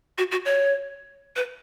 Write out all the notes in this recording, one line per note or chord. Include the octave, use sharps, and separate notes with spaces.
F#4
F#4
C#5
B4